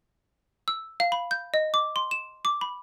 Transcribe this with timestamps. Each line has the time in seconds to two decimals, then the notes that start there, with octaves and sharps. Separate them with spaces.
0.68 E6
1.00 F5
1.12 B5
1.31 G6
1.54 D#5
1.74 D6
1.96 C6
2.11 E7
2.45 D6
2.61 B5